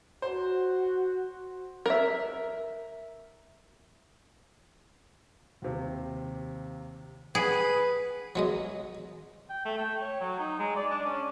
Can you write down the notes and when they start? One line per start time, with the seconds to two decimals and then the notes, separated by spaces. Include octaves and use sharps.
0.22 F#4 C5
1.86 A#4 E5
5.62 D#2 C3
7.35 G#4 B4 F#5
8.35 F#3 G#3 D#5
9.50 G5
9.65 A3
9.78 G5
10.01 C#5
10.20 F#3
10.39 D#4
10.59 G#3
10.76 D5
10.90 D4
11.06 C#4